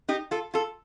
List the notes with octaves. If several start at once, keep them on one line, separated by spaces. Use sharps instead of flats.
D#4 G4
F4 A4
F4 A4